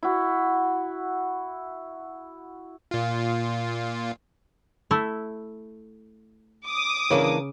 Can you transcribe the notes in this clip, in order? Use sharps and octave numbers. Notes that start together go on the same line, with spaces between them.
E4 F#4
A#2 F4
A3 E4
D6 D#6
C#3 E3 A#3 D4